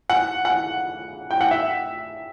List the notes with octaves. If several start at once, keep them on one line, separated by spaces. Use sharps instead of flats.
F#5
F#5
G5
F#5
E5